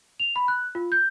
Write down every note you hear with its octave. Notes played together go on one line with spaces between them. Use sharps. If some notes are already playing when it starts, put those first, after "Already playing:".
F7
B5
F#6
F4
G6